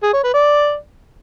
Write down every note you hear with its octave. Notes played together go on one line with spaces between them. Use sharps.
G#4
C#5
B4
D5